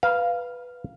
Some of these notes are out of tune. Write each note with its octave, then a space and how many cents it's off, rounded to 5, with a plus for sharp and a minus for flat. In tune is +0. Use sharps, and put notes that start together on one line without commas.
B4 +0 F5 -5 A#5 +45